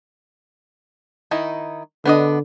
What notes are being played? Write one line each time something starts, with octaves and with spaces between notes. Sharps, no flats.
D#3 D#4 E4
D3 B3 D4 D#5